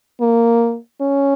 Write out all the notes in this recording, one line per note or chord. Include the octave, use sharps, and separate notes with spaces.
A#3
C#4